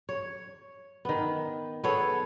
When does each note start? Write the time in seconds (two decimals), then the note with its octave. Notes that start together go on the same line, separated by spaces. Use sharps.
0.09 C#5
1.05 D#3 B3
1.84 B3 G#4 A4 C#5